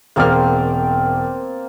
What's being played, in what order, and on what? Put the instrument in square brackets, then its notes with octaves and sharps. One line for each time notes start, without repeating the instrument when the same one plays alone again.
[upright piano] E1 F6 [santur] A#3 C4 D5